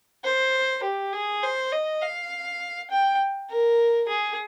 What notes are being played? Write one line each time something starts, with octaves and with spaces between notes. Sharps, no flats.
C5
G4
G#4
C5
D#5
F5
G5
A#4
G#4